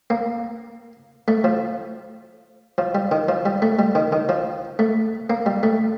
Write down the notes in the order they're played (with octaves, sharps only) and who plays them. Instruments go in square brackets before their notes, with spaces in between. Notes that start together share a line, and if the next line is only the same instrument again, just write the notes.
[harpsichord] A#3
A3
F3
F3
G3
D#3
F3
G3
A3
G3
D#3
D#3
F3
A3
A#3
G3
A3